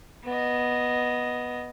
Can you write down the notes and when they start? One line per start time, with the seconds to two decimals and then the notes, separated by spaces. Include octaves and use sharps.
0.24 B3 D#5